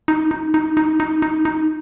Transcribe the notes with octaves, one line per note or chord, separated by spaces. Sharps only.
D#4
D#4
D#4
D#4
D#4
D#4
D#4